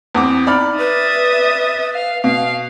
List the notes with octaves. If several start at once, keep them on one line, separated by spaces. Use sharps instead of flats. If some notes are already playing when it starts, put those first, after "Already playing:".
E2 C4 D6
D#4 D5 B5 F6
B4 E5 D#6 A6
F5
B2 F5